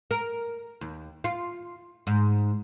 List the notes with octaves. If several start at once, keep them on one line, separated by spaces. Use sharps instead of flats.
A#4
D#2
F4
G#2